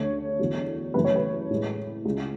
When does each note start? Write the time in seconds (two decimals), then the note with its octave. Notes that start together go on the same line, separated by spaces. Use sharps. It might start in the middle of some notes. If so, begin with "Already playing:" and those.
Already playing: D2 D3 A3 C#5
0.39 E2 D3 F#3
0.94 F#2 C#3 E3 A3 B4
1.04 C#5
1.15 B4
1.50 A2 G#3
2.05 C#2 C#3 G#3